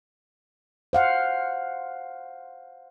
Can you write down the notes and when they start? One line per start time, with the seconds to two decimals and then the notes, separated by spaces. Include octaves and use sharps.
0.93 C5 F5 F#5